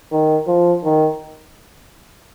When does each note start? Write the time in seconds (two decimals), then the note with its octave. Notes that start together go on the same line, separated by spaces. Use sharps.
0.12 D#3
0.47 F3
0.83 D#3